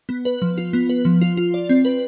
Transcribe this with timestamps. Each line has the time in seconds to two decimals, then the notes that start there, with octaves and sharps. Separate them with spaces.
0.09 B3
0.25 B4
0.42 F3
0.58 F4
0.73 B3
0.89 B4
1.05 F3
1.21 F4
1.37 F4
1.54 D5
1.69 C4
1.85 B4